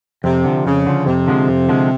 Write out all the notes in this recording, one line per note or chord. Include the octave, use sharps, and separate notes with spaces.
F2 C3
D3 F3
F2 C#3
D3 F3
F2 C3
D3 F3 G#3
F2
D3 F3 G#3